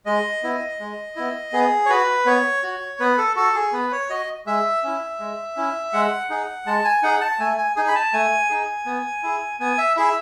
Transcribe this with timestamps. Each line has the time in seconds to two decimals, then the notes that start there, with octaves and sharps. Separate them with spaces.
0.06 G#3 D#5
0.43 B3 E4
0.80 G#3
1.16 B3 E4
1.53 B3 G#4
1.86 C#5
1.90 F#4 B4
2.26 B3 C#5
2.63 F#4
3.00 B3 B4
3.18 A4
3.36 F#4 A4
3.55 G#4
3.73 B3 B4
3.92 C#5
4.10 F#4 D#5
4.46 G#3 E5
4.83 C#4 E4
5.20 G#3
5.56 C#4 E4
5.93 G#3 F#5
6.30 D#4 G#4
6.66 G#3 A5
6.84 G#5
7.03 D#4 G#4 F#5
7.21 A5
7.40 A3 G#5
7.58 G#5
7.76 D#4 G#4 G#5
7.88 B5
7.95 A5
8.13 A3 G#5
8.50 D#4 G#4
8.86 B3
9.23 E4 G#4
9.60 B3 G#5
9.78 E5
9.97 E4 G#4 E5